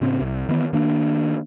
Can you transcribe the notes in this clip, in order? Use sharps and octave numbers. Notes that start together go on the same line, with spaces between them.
A2 C#3 C4
C2
D#3 E3 B3
D#3 A#3 D4